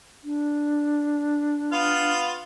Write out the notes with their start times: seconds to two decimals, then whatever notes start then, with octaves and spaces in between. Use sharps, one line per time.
0.24 D4
1.72 B3 F4 F5